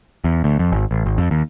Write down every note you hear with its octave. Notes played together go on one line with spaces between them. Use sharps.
E2
D2
F2
G#1
A1
G#1
F2
D#2